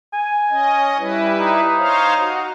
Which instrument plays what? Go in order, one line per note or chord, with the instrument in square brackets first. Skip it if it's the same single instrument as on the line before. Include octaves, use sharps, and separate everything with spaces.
[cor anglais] G#5
[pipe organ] C#4 D#5
G3 E4 B4
[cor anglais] D#4
[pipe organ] C5 C#5 F5
F#4